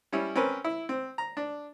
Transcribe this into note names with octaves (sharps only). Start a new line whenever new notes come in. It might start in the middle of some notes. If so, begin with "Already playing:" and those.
G3 C#4 E4
C4 C#4 A#4 B4
E4
C4
A#5
D4